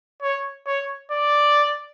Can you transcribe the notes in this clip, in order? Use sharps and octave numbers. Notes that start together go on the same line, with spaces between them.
C#5
C#5
D5